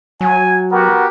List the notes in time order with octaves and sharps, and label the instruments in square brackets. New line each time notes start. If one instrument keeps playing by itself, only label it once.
[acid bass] F#3 [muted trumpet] G#5
[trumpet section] B3 G4 A#4 [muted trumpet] F#4